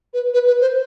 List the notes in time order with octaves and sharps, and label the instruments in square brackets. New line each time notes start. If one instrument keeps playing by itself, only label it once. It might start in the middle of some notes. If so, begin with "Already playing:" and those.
[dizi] B4
B4
B4
C5